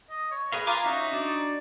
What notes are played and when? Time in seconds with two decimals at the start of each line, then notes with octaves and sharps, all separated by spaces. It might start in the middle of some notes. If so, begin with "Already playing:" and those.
0.10 D#5
0.31 C#5
0.52 G#4 A#4 B4 F5
0.67 F4 F5 G#5 A#5 D6
0.84 C#4 D#4 F#4 E5
1.13 D4 F#4 D5